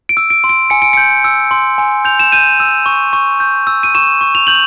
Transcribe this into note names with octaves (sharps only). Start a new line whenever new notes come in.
D7
E6
D7
C6
D7
G#5 C#7
D7
G6 C#7
E6
C6
G#5
G6 F7
E7
G6 D#7
E6
C#6
C#6
G6
E6
D#7
C#6 E7
C#6
F7
G6 F#7